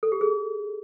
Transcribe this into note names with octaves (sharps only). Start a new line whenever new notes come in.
A4
G4
G#4